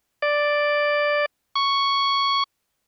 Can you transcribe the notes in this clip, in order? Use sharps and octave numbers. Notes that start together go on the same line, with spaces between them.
D5
C#6